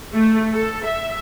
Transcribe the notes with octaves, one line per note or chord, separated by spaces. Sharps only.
A3
A4
E5